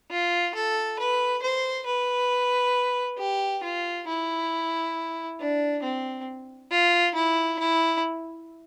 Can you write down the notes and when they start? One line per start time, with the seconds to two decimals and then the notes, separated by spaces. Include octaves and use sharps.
0.10 F4
0.55 A4
0.99 B4
1.42 C5
1.87 B4
3.19 G4
3.63 F4
4.07 E4
5.40 D4
5.83 C4
6.71 F4
7.15 E4
7.59 E4